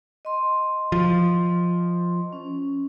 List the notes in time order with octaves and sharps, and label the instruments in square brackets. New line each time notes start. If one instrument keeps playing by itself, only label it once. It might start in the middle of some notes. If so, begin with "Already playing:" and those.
[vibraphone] D#5 C6
[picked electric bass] F3
[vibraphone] C#4